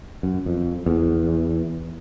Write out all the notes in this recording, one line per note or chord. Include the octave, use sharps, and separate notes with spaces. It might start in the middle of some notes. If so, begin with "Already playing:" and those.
F#2
F2
E2